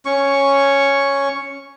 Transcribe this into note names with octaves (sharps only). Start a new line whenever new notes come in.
C#4 C#6